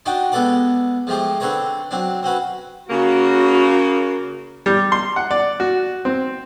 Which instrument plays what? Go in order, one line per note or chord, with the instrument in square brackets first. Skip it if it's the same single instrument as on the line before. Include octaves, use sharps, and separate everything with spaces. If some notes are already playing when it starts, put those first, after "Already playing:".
[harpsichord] D4 D#4 F4 F#4 G5
G#3 B3 A4 B4 D5 F#5
F3 G#3 A3 G4 C5
D3 C4 B4 C#5 A#5
F#3 C4 D4
C4 C#4 F#4 B4
[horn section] C#3 A#3 [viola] F#4
[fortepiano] G3
C6
F#5
D5
F#4
C4